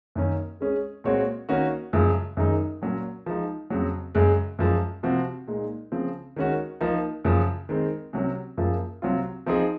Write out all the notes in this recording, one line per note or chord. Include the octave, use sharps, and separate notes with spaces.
F#2 D#3 A#3 C#4
G#3 C#4 G#4
A#2 G#3 C4 F#4 C#5
D#3 A#3 C#4 F#4
F#2 C#3 F3 G#3
F#2 D#3 G#3 D#4
A#2 F#3 C#4
F3 G#3 D#4
F2 C#3 F#3
F#2 C#3 G#3
F#2 F3 G#3
C3 F3 C4 F#4
A#2 G#3 D#4
C#3 F3 C4
D#3 G#3 C#4 F#4
F3 A#3 D#4
F#2 C#3 F3
D#3 G#3 C4
C3 F#3 C#4
F#2 F3 A#3 F4 G#4
C3 F#3 C4 F4
F3 C4 D#4 G#4